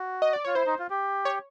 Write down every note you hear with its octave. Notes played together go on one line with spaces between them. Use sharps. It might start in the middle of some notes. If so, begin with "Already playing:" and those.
Already playing: F#4
D#5
D5
F4 C#5
E4 C5
D#4
F4
G4
C#5